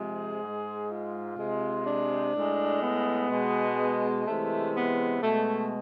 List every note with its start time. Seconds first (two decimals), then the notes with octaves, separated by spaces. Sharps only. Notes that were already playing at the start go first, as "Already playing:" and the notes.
Already playing: C3 F3 G#3 G#4
0.41 G#2 G#3
0.89 F4
1.38 C3 G#3
1.86 D4
2.34 A2 G#3
2.82 B3
3.31 B2 G#3
4.27 C3 E3 G#3 A3
4.75 B3
5.23 B2 G#3 A3